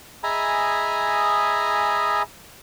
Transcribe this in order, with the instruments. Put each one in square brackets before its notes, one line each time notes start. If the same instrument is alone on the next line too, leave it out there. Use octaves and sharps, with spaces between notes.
[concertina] G#4 D#5 E5 G#5 A#5 B5